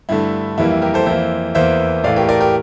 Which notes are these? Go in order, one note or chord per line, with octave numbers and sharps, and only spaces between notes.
G2 D3 A3 E4
F2 E3 G3 A#3 E4
E4
G4 A#4
A4 C5
F2 E3 A#3 C5 E5
E2 E3 A#3 C5 E5
A2 E3 A3 D5 F5
G4 A#4
A#4 D5
G4 A#4